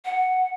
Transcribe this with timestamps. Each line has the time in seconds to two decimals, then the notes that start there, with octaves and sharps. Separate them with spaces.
0.05 F#5